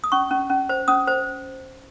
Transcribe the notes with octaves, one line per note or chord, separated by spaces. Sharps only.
D#6
C#4 C#6
C#4
C#4
C5
C#4 D#6
C5